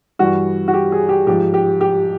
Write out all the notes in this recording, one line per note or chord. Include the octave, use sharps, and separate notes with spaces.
G2 E3 G3 F#4
F#4
G4
G#4
G4
G#2 F3 G4
G4
G4